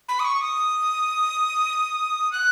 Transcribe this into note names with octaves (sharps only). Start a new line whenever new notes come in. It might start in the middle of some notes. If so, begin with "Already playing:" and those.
B5
D#6
C#6
D#6
F#6